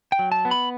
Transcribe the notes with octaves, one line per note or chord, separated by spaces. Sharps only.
G5
F#3
A5
B3
B5